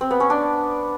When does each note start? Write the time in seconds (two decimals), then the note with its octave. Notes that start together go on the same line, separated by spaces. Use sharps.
0.01 C4
0.11 B3
0.20 C#4
0.30 D4